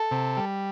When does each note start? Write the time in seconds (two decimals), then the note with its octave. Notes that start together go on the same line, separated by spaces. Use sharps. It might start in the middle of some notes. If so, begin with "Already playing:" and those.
Already playing: A4
0.11 C3
0.37 G3